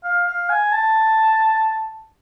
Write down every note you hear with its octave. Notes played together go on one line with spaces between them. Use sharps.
F5
F5
G#5
A5